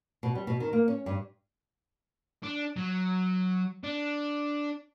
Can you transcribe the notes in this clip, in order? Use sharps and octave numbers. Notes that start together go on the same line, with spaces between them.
B2
G3
B2
D#3
A#3
C#4
G2
D4
F#3
D4